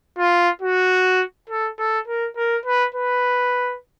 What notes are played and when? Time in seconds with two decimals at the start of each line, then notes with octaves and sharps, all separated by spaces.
0.19 F4
0.62 F#4
1.49 A4
1.79 A4
2.07 A#4
2.37 A#4
2.65 B4
2.94 B4